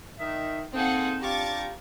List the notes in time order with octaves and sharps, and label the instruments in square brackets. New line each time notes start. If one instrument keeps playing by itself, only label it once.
[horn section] D#3 [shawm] E5
[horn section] A#3 A4 [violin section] C4 G#4 F#5 [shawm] D#4
[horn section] D4 F4 G4 [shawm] A#5 [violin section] C#6 D6 A6